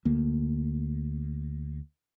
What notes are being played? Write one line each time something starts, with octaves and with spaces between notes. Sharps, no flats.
D2 A#3